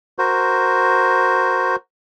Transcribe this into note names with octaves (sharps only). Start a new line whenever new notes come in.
F#4 A#4 C5